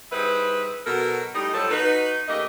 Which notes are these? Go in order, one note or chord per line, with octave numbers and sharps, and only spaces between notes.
G3 D#4 E4 G#4 B4 C5
B2 F#3 A4 A#4
A2 G3 D#4 D#5
G2 F3 F#3 A4
D#4 F#4 B4
C#3 A3 A#3 G4 D#5